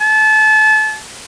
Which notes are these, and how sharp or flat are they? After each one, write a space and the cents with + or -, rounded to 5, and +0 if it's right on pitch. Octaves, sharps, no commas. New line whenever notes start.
A5 -30